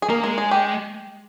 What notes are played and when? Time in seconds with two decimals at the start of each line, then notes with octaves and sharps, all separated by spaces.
0.02 G#4
0.09 A#3 A#4
0.23 G#3 A#4
0.38 G#4
0.51 G4